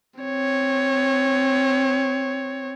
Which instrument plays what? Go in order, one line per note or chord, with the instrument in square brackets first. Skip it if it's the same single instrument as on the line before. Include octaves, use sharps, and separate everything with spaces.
[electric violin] C4 C#5